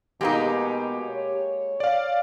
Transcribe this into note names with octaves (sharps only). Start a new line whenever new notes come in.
B2 G#3 A#3 D#4 G4
C#5
D5 F5